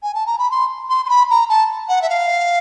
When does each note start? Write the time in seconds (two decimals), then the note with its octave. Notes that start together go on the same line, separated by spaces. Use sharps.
0.02 G#5
0.14 A5
0.26 A#5
0.38 B5
0.50 C6
0.89 C6
1.05 C6
1.09 B5
1.30 A#5
1.49 A5
1.88 F#5
2.01 E5
2.09 F5